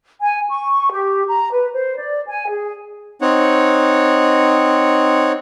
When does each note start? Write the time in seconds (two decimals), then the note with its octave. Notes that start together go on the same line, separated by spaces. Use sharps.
0.21 G#5
0.50 C#6
0.91 G4
1.27 A#5
1.52 B4
1.74 C5
1.98 D5
2.28 G#5
2.47 G#4
3.21 C4 D#4 C#5 F#5